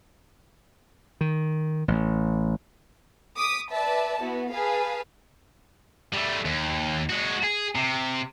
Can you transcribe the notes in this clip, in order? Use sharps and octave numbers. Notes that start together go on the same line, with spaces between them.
D#3
A1
D6 D#6 B6
B4 D5 E5 A5
B3 E4 F#4
G#4 B4 F5 A5
G3 A3
D#2
G#3 F#4
G#4
C3